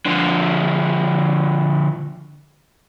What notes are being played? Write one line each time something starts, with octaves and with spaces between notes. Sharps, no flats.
D3 F3